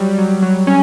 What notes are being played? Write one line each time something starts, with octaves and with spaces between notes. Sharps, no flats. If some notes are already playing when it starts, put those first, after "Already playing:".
Already playing: F#3 G3
F#3
F#3
C#4